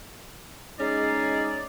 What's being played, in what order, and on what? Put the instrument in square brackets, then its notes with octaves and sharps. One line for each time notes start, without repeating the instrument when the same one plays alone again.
[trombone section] G#3 D#4 [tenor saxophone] C#4 [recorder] G#4 [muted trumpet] D5